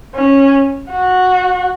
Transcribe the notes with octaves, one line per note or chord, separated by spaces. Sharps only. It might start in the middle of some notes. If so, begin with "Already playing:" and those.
C#4
F#4